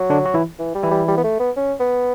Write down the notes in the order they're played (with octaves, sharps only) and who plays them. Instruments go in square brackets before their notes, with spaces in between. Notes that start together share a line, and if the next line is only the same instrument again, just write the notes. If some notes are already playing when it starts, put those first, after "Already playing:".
Already playing: [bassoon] F#3
[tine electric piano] D3 D4
F#4
E3 E4
[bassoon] E3
G3
[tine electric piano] E3 E4
[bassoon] G3
G3
B3
A3
B3
C#4
B3